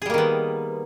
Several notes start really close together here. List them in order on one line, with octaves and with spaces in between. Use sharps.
G#4 G3 A#3 D#3 B3